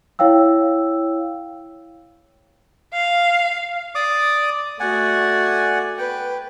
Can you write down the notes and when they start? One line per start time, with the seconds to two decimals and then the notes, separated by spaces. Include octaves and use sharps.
0.19 E4 C#5 F5 G5 E6
2.93 F5
3.95 D5 D6 D#6
4.80 A3 F#4 D5 F#5 G#5
5.98 B4 G5